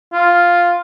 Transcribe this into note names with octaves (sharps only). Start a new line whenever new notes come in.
F4